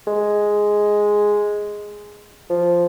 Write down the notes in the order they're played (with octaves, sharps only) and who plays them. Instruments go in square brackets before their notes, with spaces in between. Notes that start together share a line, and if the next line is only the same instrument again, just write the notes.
[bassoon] G#3
F3